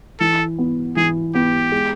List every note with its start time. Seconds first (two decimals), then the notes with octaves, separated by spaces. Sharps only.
0.20 E3 A4
0.59 B3
0.96 E3 G#4
1.35 B3 G4
1.72 G#3